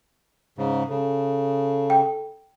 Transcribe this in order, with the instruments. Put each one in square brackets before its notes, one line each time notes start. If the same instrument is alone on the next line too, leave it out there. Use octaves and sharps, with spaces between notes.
[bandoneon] G#2 C#3
[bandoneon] C#3 [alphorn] A4
[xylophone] G5